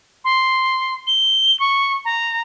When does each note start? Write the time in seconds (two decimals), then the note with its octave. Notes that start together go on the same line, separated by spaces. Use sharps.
0.24 C6
1.07 G7
1.60 C#6
2.05 A#5